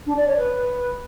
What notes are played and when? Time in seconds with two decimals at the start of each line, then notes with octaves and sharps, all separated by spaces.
0.06 D4
0.16 D5
0.26 C#5
0.37 B4